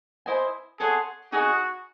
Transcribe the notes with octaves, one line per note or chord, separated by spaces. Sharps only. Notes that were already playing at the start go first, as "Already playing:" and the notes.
E4 C5 D#5 G#5
G#4 A4 C#5 F#5 C6
D#4 F#4 G#4 D#5